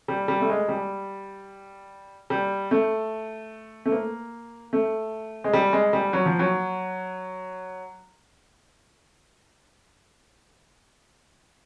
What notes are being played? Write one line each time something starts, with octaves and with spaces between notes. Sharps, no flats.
G3
G3
A3
G#3
G3
G3
A3
A3
A#3
A3
G#3
G3
G#3
G3
F#3
F3
F#3